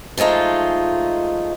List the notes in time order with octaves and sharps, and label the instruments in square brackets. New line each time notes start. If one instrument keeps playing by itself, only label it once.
[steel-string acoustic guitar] F3 G#3 A3 D#4 F4